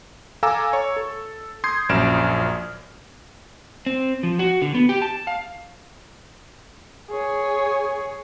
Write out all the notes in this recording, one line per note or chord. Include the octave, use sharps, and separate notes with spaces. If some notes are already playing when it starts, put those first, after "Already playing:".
A4 F5 G#5 A#5 D6 E6
C#5 C#6
A4
C6 D#6 G6 G#6 C7
A#1 F#2 F6 D7 E7
C4
F3
F#4
D3
B3
G4
A5
F5
G#4 C#5